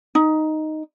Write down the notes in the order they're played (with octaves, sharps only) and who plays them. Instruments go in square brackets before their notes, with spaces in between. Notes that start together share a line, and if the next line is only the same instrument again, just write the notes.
[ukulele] D#4